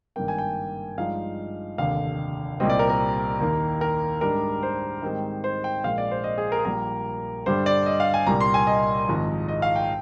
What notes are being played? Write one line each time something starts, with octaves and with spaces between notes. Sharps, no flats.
G#1 G2 D#3 A#3 G5
G#5
G5
G2 F3 G#3 D#4 F5
F1 D#2 D3 F5
C2 A#2 G3 C4 D#5
D5
A#4
A#4
D#2 D#3 A#3
A#4
G#2 G3 D4 A#4
C5
G#2 D#3 G3 C4 D#4
C5
G5
A#1 A#2 G#3 F5
D5
C5
D#5
G#4
A#4
G#4
A#1 A#2 G3 A#3 A#4
G2 D3 G3 D4 C5
D5
D#5
F5
G#5
C2 A#2 G3 A#3 A#5
C6
G#5
D#5
G#1 G#2 F3
D#5
F5
G5